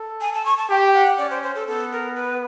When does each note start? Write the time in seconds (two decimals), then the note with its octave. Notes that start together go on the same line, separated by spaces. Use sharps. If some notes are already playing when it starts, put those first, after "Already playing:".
Already playing: A4
0.21 G#5
0.34 A5
0.45 C#6
0.58 A5
0.70 G4 G5
0.94 F#5
1.18 C#4 D5
1.30 C5
1.43 C5
1.55 A4
1.68 B3 A4
1.92 A#4
2.15 B4